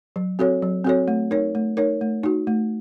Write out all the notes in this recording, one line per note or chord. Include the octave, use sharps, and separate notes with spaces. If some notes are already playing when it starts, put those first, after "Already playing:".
F#3
C4 F#4 A4 C#5
F#3
C4 F#4 A4 C#5
A3
D#4 A#4 C#5
A3
D#4 A#4 C#5
A3
D#4 F#4
A3